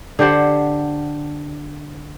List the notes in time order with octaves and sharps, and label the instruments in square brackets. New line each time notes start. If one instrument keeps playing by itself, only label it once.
[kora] D3 G4 C5 F#5